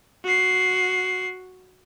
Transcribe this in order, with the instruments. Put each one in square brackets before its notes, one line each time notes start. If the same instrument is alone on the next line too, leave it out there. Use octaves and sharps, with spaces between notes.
[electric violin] F#4 C7